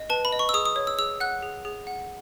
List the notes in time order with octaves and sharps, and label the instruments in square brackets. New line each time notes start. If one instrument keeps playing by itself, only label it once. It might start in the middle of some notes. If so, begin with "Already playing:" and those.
Already playing: [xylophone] D#5
B4 A5
B5
D#5
C#6
E6
G#4 D#6
D#6
C#5
E6
G#4 E6
F#5 F#6
G#4
G#4
F#5